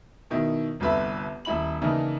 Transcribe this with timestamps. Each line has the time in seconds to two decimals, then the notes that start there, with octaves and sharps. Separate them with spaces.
0.30 B2 D#3 E4
0.80 G1 C2 D3 B4 E5 B5
1.45 D#1 E4 B5 F#7
1.82 C#3 E3 A#3 D4 D#4